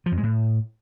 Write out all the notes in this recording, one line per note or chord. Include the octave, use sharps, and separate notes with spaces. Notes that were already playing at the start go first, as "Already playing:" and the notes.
F3
F2
G#3
A2